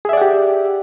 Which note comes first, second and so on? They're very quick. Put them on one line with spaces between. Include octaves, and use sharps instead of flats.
G#4 E5 D5 F#5 G4